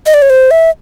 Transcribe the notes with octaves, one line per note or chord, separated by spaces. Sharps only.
D#5
D5
C#5
C5
E5